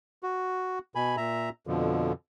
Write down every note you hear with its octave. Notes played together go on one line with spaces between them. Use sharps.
F#4
B2 G#5 B5
A#2 E5 A#5
F2 B2 D3 F3